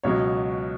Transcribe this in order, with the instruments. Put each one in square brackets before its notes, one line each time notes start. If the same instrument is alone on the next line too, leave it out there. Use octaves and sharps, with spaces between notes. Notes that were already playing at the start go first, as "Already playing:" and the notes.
[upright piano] C#2 B2 F#3 C#5